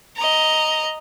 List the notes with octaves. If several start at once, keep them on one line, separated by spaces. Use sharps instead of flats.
D#5 A#5